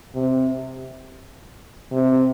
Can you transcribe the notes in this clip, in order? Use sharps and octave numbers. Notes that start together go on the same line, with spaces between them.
C3
C3